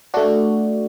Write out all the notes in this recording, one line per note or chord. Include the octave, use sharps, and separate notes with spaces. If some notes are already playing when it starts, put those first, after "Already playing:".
A3 D4 F#4